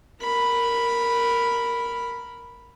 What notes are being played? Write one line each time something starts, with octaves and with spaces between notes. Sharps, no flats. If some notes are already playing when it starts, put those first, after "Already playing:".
A#4 B5